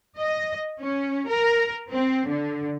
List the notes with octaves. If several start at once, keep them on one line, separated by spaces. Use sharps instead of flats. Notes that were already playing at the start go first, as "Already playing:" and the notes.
D#5
C#4
A#4
C4
D3